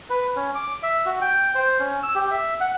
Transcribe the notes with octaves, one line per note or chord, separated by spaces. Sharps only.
B4
C#4
D6
E5
F#4
G5
C5
C#4
E6
G4
E5
F#5